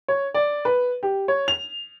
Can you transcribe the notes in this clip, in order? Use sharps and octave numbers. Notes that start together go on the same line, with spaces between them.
C#5
D5
B4
G4
C#5
F7